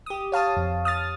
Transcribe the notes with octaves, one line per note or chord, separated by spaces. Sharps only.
G4 D#6
C#5 F5 A5 D#6
F2
D#6 F6 A6